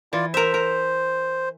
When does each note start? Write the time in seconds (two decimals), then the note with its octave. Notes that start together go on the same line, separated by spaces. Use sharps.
0.13 E3 F4 D5
0.34 A#4 C5 E5
0.54 A#4